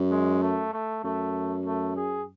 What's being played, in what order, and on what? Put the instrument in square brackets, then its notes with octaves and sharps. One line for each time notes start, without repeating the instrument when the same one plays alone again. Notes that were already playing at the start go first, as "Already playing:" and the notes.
Already playing: [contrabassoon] F#2
[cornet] G#3
A3
A3
[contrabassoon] F#2 [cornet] A3
[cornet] A3
G#4